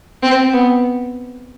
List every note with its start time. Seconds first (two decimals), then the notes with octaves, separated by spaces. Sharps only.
0.23 C4
0.53 B3